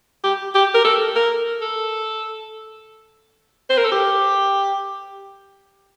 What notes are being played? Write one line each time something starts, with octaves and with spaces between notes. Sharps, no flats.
G4
G4
A#4
A4
A#4
A4
C5
A#4
A4
G4